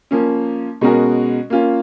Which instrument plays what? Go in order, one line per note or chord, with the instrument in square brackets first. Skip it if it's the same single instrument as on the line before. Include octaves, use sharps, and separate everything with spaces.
[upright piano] F3 A#3 C#4
B2 G#3 C#4 F#4 A#4
A#3 C#4 F4